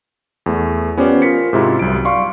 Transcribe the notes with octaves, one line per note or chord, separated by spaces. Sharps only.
E2 A3
B3 C#4 F4 G4 C5 D5
F4 A#4 B6 C#7
G#2 C3 E4 F4
C2 F#3 D7
D5 F5 C6 C#6